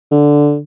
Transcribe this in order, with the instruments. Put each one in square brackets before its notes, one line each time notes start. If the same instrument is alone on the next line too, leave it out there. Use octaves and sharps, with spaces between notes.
[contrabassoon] D3